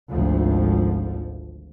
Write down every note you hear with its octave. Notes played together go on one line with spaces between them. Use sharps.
G#1 D2 F3